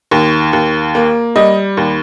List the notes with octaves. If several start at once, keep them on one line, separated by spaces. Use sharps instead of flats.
D#2
D#2
A#3
G3 D#5
D#2